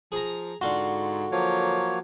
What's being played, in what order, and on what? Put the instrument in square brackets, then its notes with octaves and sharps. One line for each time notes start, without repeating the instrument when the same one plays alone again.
[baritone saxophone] F3 [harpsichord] G#4 A#5
[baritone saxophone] G#2 [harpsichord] D3 F4 C6 [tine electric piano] F#4
[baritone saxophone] F3 [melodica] F#3 A#3 C#5